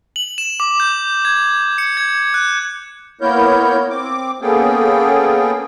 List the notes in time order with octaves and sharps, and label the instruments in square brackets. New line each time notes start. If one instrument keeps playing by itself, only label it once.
[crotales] F#7
E7
D6
G6
G#6
C#7
G#6
F#6
[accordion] A#3 B3 E4 A#4 C#5 G6
C4 D6
A#3 B3 C#4 G#4 A4 G5